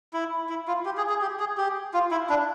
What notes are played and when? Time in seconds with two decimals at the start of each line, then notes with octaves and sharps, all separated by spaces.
0.13 E4
0.49 E4
0.67 F4
0.86 G4
0.97 G#4
1.09 G#4
1.22 G4
1.40 G#4
1.57 G4
1.94 F4
2.11 E4
2.29 D4